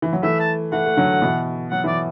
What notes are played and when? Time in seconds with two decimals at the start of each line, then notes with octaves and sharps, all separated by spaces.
0.02 E3
0.13 F#3
0.22 E3 A3 E5
0.40 A5
0.72 E3 A3 F#5
0.86 A3
0.97 D3 F#3
1.22 B2 E3
1.71 F#3 F#5
1.84 E3 D5